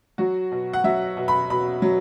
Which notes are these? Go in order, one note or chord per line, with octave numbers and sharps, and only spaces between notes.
F#3 F#4
B2
F#5
F#3 E5
B2
B5
B2 B5
F#3